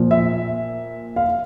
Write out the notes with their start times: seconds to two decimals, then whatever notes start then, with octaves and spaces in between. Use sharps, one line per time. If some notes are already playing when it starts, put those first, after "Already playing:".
Already playing: A#2 F3
0.11 E5
1.16 F5